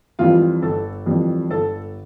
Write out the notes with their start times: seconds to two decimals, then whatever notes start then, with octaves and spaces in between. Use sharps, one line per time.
0.19 F2 E3 G3 F4
0.62 G1 A4
1.06 F2 E3 G3
1.50 G1 A4